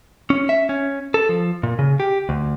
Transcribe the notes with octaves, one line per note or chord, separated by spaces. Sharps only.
C#4
E5
C#4
A4
F3
A#2
C#3
G4
D2